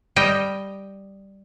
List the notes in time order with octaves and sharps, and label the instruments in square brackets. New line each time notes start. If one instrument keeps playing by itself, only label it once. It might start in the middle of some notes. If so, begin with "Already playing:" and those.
[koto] G3 D#5 G5